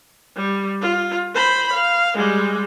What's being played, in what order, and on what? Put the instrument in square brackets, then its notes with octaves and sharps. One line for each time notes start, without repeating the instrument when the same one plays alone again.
[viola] G3
F4
C5 B5
F5
G3 G#3